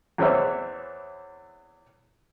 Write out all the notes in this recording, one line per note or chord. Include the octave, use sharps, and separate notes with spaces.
E2 E3 C4 C#5 E5 E6